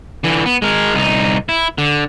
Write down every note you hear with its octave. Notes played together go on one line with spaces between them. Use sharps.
D3 E3
B3
G#3 A#4
C2 D#4
E4
D3